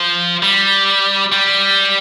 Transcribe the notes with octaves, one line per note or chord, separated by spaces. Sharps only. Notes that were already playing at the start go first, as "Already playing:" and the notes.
Already playing: F3
G3
G3